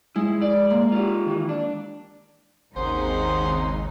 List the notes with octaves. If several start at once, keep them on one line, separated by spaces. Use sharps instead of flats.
G#3 E4
D5
A#3
F4 G4
D#3 E3
D4
G#1 D#2 C#3 D#4 G#4 C5 F#5 C6